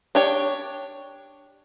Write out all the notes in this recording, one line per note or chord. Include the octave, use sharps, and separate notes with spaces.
D4 G4 C#5